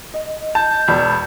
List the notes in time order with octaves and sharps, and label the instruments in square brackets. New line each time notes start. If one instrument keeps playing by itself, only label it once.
[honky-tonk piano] D#5
[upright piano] A5 [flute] G6
[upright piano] E1 [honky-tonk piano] D5 A5 B5